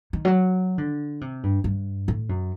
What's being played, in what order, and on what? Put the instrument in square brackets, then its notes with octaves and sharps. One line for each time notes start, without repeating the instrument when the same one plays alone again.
[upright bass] D#3
F#3
D3
C3
G2
G2
A2
F#2